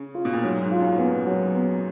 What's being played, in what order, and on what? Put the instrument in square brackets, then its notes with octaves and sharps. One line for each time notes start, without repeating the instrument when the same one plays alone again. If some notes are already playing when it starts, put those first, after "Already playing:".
Already playing: [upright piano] C#3
[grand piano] F4
[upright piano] B2
A#2
[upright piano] G#2 [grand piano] F#3
[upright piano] G#2
[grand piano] F4
[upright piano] F#2
[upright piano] A#2 [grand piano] B3
[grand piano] F#3
B3